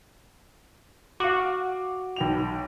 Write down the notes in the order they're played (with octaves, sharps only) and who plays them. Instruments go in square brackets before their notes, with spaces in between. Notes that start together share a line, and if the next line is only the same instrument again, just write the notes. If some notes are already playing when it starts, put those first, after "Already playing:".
[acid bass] F#4 [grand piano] F5 D6
[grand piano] B1 G5 F7